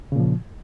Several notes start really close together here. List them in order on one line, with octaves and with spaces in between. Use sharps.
C#3 A#2 F3